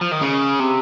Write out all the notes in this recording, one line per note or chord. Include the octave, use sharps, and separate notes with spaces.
F3
D#3
C#3
C3